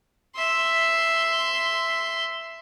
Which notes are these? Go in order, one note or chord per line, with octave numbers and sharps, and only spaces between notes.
E5 C6